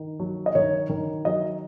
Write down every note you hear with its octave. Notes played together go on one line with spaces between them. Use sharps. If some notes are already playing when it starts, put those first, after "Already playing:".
Already playing: D#3
F#3
D#5
D#3 C#5
D#3
F#3 D#5